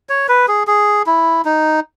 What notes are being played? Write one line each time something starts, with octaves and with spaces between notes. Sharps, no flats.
C#5
B4
G#4
G#4
E4
D#4